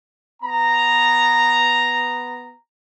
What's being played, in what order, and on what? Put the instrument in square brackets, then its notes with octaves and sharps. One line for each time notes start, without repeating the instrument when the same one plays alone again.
[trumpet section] B3 A#5